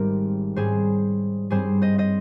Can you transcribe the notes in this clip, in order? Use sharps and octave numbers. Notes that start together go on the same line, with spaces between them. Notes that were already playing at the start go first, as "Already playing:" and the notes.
Already playing: G#1 G#2 G3 C4 G4 A#4
G#2 G3 C#4 G#4 C5
G2 G3 C4 G#4 C5
C5 D#5
C5 D#5